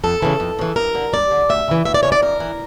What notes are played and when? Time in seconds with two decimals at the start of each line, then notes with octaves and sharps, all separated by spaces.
0.04 F2 A4
0.22 C#3 E3
0.40 F2
0.59 C#3 E3
0.76 G2 A#4
0.95 D3
1.13 G2 D5
1.31 D3
1.49 D2 E5
1.68 C#3 E3
1.85 D2 E5
1.94 D5
2.03 C#3 E3 C#5
2.12 D5
2.22 F2 A#4
2.40 E3